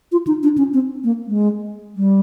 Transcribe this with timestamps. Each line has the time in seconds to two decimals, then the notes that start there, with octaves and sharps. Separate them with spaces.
0.12 F4
0.27 D#4
0.43 D4
0.58 C#4
0.73 C4
1.04 A#3
1.27 G#3
1.96 G3